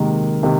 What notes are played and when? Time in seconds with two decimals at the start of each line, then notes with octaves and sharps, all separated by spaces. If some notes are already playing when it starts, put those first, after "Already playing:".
Already playing: C3 D#3 G#3 A#3
0.43 C3 D#3